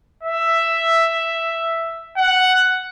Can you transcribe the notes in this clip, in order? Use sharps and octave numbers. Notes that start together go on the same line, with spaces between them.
E5
F#5